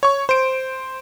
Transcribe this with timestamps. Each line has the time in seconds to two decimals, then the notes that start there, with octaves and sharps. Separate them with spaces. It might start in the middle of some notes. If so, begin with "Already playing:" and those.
0.03 C#5 C#6
0.29 C5 D7